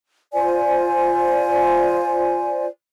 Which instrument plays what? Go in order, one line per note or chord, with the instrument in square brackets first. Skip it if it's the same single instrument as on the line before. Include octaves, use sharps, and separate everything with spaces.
[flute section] F4 C5 D5 G#5